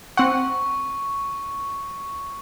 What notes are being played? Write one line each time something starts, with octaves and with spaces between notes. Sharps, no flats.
C4 F#5 C#6